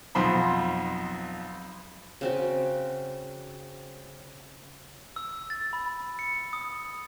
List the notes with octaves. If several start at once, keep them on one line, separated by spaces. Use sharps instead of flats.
B1 F2 C5 B5
C#3 C4 F#4
E6
A6
B5
C#7
D#6